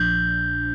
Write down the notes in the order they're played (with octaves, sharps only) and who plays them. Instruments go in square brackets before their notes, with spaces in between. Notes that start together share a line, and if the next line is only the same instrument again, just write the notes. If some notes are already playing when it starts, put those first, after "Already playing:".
Already playing: [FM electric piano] A#1 A#2 F3 D4 [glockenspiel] G6